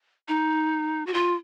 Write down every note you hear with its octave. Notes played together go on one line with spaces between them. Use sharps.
D#4
F#4
F4